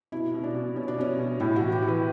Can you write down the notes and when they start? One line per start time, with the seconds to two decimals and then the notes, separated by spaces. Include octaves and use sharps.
0.12 B2 E4
0.34 B2
0.44 D4
0.54 B2
0.76 B2 C#4
0.88 D4
0.98 B2 C#4
1.18 B2
1.40 A2 E4
1.56 F#4
1.61 E3
1.72 G4
1.82 E3
1.88 B4